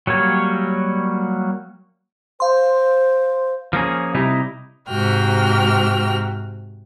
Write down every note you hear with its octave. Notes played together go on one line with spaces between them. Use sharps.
F#3 G3 A#3 C#5
C5 F5 C6
F3 A#3 C#4 G#4
C3 G3 D#4 E4
G#2 C3 F#4 G5 F6